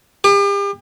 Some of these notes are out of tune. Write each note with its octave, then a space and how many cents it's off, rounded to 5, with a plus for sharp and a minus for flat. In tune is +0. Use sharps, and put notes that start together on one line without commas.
G4 +40